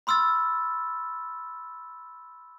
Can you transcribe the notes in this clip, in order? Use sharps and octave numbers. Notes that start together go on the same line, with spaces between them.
B5 C6 E6 F6 A6